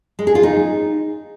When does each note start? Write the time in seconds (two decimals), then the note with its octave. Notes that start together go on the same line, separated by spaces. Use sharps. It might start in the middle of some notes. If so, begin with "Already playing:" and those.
0.19 G#3
0.27 G#4
0.35 F4
0.43 D#4